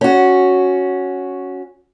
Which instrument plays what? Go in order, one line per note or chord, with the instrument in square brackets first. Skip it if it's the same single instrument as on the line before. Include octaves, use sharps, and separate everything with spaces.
[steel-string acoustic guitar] C#4 F#4